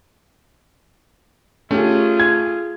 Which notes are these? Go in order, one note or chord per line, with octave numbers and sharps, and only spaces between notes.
A3 C#4 F4 G4 G#4
G#6